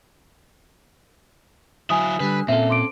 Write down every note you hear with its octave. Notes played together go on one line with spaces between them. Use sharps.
F#3 E4 G#5 D#6
D3 G3 B4
A#2 C4 C#4 A4 E5
C6 D6 D7